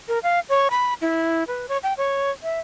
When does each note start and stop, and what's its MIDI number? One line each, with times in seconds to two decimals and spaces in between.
0.08 0.19 70
0.23 0.40 77
0.49 0.68 73
0.71 0.94 83
1.01 1.44 64
1.48 1.66 71
1.69 1.78 73
1.83 1.93 79
1.97 2.31 73
2.43 2.60 76